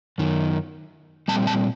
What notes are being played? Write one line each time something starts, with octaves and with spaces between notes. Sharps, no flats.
F#2 D#3
A#2 G3 C4 A5
A5